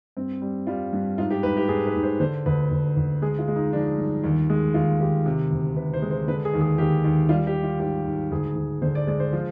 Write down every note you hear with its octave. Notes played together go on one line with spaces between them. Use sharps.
G2 C4
G3
G3 F4
G2
G#2 F4
G4
G#2 B4
G4
G#2 G#4
B4
G#2
C5
D3 C5
D2 B4
D2
D2
G#3 G#4
F4
G#3
D#4
F3 D4
G2
D#2
G#3
D#2 F4
D#2 G4
C3
D2
C3 B4
C5
G#3
C5
D3 B4
G#4
D#2
G#4
D#2 G4
D#2
G3 F4
G4
G3
F4
G#2 G4
G#2
D2 G#4
D2
D3 C5
D5
G#3 D5
C5
F3